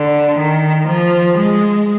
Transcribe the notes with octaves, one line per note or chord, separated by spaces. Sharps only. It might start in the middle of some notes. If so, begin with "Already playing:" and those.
Already playing: D3
D#3
F3
G#3